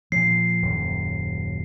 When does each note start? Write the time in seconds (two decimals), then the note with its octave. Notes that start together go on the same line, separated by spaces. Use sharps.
0.12 A#2 F3 C7
0.62 D#1 F#2